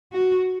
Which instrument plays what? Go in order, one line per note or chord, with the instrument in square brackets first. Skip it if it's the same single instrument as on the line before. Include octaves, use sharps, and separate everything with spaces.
[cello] F#4